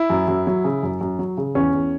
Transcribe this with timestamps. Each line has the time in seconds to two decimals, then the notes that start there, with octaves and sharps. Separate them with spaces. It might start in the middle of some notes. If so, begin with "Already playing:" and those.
Already playing: E4
0.10 F#2
0.28 F#2
0.47 F#3
0.64 C#3
0.83 F#2
1.01 F#2
1.19 F#3
1.37 C#3
1.55 E2 C#4
1.73 E2